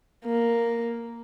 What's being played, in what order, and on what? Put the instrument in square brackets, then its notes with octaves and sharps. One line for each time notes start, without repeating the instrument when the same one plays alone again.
[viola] A#3